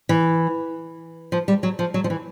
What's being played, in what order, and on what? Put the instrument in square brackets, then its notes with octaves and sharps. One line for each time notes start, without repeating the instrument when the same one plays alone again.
[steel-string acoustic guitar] E3
F3
G3
F#3
F3
F#3
F3
E3